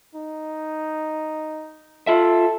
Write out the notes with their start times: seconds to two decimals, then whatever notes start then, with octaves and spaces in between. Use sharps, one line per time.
0.15 D#4
2.07 F4 A4 E5